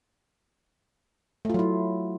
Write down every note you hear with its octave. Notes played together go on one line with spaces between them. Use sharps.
F#3 A3 E4 F4